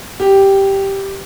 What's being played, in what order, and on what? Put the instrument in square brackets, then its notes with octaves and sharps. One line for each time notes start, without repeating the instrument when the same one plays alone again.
[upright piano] G4